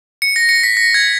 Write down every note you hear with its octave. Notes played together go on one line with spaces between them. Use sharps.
C#7
A#6
C#7
B6
A#6
G#6